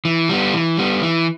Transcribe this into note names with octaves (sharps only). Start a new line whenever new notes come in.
E3
G3 B3
E3
G3 B3
E3